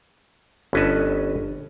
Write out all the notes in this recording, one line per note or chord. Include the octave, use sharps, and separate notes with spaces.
G1 C#4 B4 D#5 A5